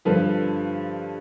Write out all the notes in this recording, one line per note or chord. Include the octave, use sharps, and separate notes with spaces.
G2 D3 F3 A4 B4